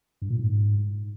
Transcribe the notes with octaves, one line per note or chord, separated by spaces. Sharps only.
G2
A#2
G#2